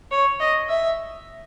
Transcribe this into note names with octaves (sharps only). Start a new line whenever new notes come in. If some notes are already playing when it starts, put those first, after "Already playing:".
C#5
D#5
E5